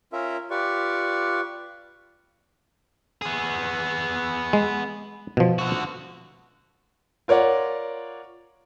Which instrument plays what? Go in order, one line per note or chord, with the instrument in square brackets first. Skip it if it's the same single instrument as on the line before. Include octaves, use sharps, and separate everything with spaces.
[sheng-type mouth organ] C#4 F4 A#4 E5
F4 G4 B4 D5 C#6
[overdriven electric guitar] B3 G#4
[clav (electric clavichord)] G#3
B2 F3
[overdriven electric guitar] D3 F#4
[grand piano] F4 A#4 C#5 D5 F#5